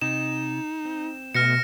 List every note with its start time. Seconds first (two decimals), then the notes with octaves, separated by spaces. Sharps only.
0.01 C3 D#4 E7
0.85 C4
1.35 B2 A3 B3 F6 A#6 C#7